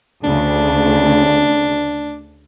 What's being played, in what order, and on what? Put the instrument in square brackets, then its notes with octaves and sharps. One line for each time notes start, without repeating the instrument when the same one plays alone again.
[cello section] D2 C#3 [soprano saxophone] D4